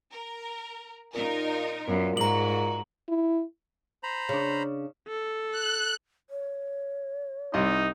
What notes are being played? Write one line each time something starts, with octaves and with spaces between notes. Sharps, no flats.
A#4
A#2 D#4 F4 A#4
F#2 A#2 B3
G#2 G#3 F#4 A#5 F#7
E4
C5 A#5 B5
C#3 D4
A4
F#6
C#5
C2 D#4 D#5 C6